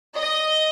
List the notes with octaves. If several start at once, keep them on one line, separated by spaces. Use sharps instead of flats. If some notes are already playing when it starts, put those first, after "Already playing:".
D#5